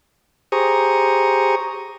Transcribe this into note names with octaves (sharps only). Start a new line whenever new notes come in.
G4 G#4 C5 A#5 C#6 D#6